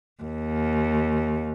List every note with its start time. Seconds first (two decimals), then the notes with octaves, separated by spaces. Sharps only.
0.23 D#2